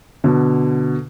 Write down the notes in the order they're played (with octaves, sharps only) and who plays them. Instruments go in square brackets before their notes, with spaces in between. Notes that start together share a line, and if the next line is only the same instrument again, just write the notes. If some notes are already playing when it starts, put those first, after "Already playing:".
[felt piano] B2 D3